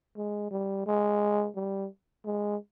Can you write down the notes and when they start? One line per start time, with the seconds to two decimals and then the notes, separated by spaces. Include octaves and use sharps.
0.17 G#3
0.51 G3
0.86 G#3
1.56 G3
2.25 G#3